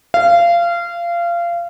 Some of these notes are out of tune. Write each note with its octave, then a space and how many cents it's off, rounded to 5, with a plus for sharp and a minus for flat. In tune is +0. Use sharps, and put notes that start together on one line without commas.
F5 -25